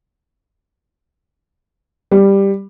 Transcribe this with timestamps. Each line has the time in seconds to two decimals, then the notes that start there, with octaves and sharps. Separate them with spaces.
2.11 G3